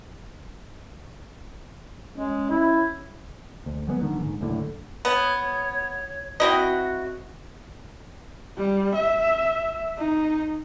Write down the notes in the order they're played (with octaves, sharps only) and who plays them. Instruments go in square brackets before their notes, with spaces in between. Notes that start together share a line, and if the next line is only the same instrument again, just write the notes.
[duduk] G#3 [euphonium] C#4
[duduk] E4
[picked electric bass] D2
F#3 G#3 A#3 B3
A#1 F#2 D3 D#3
G#2
F#1 D2 A2 D3
[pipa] B3 [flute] C#5
[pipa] C4 E4 D#5 [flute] F#4
[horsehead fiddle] G3
E5
D#4